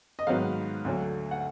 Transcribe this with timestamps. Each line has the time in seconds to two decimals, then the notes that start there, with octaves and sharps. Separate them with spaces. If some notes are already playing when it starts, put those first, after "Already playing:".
0.19 D#5
0.27 G#2 D#3 F#3 B3 F5
0.85 D2 D3 F#3
1.31 F#5